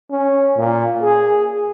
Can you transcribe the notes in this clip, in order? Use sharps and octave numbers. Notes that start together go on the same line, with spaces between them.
C#4
A#2
G#4